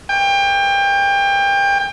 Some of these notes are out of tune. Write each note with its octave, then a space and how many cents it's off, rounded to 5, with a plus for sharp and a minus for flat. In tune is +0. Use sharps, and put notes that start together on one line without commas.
G5 +30